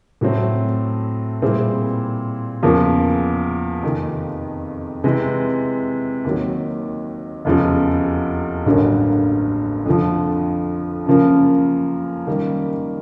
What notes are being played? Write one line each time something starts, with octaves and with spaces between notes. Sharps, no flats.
A2 F#3 A3 C4
A#2 G3 C4 E4 G#4
E2 C#3 F3 A#3
F2 C3 D#3
C3 E3 G#3
D#2 D#3 F#3
F1 E2 C#3 F3
A1 G2 D3 F#3 A#3
F2 D3 F3
F#2 C#3 F3 A#3
F#2 D#3 G3 A#3